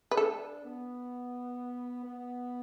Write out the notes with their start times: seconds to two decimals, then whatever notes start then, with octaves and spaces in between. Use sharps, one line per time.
0.11 B4
0.17 D4 A4
0.64 B3
2.04 B3